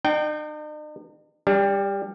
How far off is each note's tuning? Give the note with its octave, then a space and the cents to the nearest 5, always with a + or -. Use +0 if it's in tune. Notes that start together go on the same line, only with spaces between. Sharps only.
D#4 -45 G5 -15
G3 +20 D4 -15